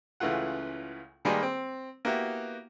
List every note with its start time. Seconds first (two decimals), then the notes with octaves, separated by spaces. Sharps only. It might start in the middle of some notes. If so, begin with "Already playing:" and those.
0.20 C#2 C#3 E3 A3 F4 F#5
1.25 D#3 G3 G#3 A#3 G#4 B4
1.43 C4
2.05 A#3 B3 E4 F#4 G4